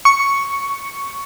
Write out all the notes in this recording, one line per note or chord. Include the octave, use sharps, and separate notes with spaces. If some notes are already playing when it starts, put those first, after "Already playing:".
C#6